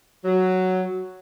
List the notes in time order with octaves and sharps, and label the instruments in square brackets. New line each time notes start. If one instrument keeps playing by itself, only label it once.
[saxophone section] F#3